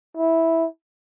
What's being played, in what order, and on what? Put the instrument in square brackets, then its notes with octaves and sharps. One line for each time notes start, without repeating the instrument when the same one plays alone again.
[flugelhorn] E4